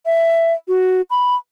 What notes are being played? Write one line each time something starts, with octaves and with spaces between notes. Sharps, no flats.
E5
F#4
B5